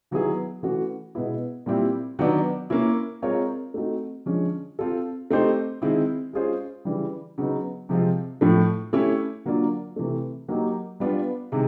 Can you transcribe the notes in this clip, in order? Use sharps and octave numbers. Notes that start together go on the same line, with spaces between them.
D#3 F#3 B3 E4 G#4
E3 A3 C#4 F#4
B2 G#3 B3 E4
A#2 G3 C4 E4 G4
D#3 F#3 B3 D4
A#3 C#4 E4
G#3 C4 F4 A#4 C#5
A3 C4 D#4 F#4
D3 F3 G#3 C#4
C4 F4 A4
A3 C4 D#4 G4 C5
D#3 G#3 C4 E4
G#3 C#4 F4 G#4 C5
C#3 E3 G3
C#3 F#3 B3 D#4
C3 F3 G#3 C4 F4
A2 F3 A3
A3 C#4 E4 G4
D3 F#3 A#3 D4 F4
C3 E3 A3
F#3 A#3 D#4 G4
G3 B3 D4 F4
C3 D#3 G#3